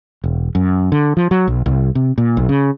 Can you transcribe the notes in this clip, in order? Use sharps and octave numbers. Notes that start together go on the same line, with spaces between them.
E1
F#2
D3
F3
F#3
B1
C2
C3
A#2
B1
C#3